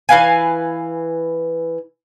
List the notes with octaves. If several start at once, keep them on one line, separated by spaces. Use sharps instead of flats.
E3 B4 F5 G#5